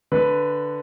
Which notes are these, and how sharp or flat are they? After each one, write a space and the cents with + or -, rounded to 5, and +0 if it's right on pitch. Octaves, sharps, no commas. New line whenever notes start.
D3 +0 B4 +0